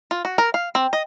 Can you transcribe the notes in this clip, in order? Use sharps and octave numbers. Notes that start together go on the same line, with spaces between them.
F4
F#4
A#4
F5
C4
D#5